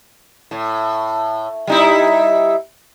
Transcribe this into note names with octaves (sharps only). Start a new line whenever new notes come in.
A2
G3 D#4 E4